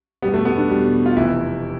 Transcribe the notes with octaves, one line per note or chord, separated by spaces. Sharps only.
E2 B2 G3 B3
A3
B3
D4
E2 B2 G3
F4
F1 F2 C3 E3 E4